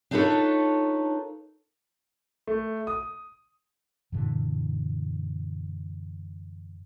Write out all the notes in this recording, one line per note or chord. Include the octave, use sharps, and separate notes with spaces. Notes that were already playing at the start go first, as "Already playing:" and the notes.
D4 D#4 F4 A4 B4 C#5
A3
D#6
F#2 A#2 D3 E3